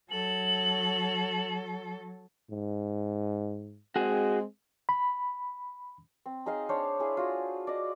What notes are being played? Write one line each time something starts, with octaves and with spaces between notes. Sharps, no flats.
F#3 A4 F#7
G#2
G#3 C4 F#4 G#4
B5
C4
D#4 G#4 D#5 F5
D4 C5 C#5 F5
E4 G#4
F4 F#4
D5 D#5